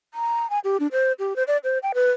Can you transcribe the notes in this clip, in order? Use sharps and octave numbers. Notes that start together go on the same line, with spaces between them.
A#5
G#5
G4
D4
C5
G4
C5
D5
C5
G5
B4